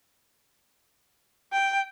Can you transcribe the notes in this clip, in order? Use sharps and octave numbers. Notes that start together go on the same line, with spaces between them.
G5